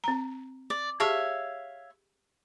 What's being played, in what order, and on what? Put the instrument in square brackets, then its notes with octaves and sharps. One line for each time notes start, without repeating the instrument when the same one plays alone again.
[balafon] C4 A#5
[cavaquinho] D5
[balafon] G4 G#4 A5 [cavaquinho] C#5 E5 F5